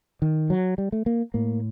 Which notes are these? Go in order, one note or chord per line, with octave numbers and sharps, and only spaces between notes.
D#3
F#3
G3
A3
A#3
A2 A#3